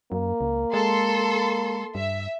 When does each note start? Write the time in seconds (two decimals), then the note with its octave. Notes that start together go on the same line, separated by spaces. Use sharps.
0.12 F#2 A#3
0.41 C#2
0.74 G#3 A4 C6
1.95 G2 E5